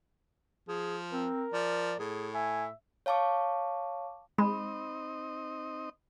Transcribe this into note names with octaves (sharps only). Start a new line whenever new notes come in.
F3 G#4
C4 A#4
F3 D5
A2 G#4
E5 G#5
C#5 F5 A5 C#6 D6
G#3 C4 D#4 D#5 B5